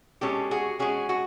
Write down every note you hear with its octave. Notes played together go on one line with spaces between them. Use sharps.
B2 G#3 C#4 G4 A4
F#4 G#4
B2 G#3 C#4 F#4 G#4
F#4 G#4